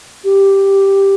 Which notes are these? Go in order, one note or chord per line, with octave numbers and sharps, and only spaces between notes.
G4